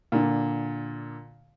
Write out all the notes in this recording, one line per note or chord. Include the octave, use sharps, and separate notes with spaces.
A#2 D3